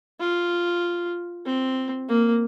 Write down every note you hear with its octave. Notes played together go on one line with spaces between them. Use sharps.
F4
C4
A#3